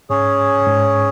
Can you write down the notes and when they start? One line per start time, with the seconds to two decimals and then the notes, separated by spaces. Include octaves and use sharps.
0.10 G#2 C#4 G#4 C#5
0.67 G#2